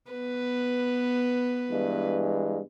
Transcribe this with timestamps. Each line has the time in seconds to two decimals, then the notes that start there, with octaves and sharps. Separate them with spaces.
0.10 B3 B4
1.70 G2 E3 G#3